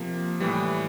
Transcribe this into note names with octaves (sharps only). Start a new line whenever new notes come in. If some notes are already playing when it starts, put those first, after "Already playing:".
Already playing: C3 F3 A#3
A2 E3 G3